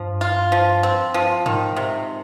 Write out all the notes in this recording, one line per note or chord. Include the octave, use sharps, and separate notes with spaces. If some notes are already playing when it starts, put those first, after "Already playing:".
Already playing: G2 F3
F4
F3
C4
F3
G#2 D#3
C3